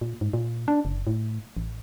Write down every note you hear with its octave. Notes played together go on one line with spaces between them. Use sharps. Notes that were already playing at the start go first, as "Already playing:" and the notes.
A#2
G#2
A#2
D4
F#1
A2
A1